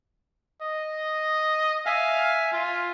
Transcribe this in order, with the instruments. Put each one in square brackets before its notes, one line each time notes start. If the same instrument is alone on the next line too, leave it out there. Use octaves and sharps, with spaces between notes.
[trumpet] D#5
[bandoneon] E5 G#5 [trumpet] F5
[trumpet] F4